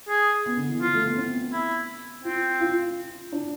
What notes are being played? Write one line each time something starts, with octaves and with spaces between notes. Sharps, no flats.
G#4
B3
D3
E3
F3 F4
A3
B3
C4
E4
C4 F4
F4
D4